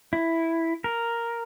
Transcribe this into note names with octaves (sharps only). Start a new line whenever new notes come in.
E4
A#4